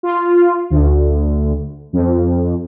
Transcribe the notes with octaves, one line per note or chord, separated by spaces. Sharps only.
F4
D2
F2